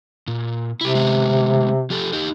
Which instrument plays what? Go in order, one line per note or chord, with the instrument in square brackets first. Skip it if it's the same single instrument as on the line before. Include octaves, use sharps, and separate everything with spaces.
[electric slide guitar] A#2
[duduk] C3 [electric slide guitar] E4 G4
[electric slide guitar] G#3 B3 C4
F3 G4 A4
D#4 G4